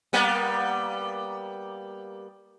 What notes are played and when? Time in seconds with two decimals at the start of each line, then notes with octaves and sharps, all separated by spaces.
0.13 G3 A#3 B3